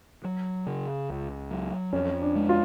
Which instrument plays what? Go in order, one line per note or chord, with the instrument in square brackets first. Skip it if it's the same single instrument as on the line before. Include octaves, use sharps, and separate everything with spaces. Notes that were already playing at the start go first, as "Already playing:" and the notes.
[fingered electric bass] F#3
C#3
C#2
F#3
[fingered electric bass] F2 [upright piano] C#4
[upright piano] D4
[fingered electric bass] G#3
[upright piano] F4